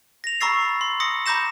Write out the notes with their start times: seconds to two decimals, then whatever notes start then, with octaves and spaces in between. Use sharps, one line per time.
0.24 A#6 F7
0.41 A#5 B5 C#6 E6 A6 C7
0.81 C6
1.00 D#6 A#6 C#7
1.26 A#5 B5 D6 G6 A#6 E7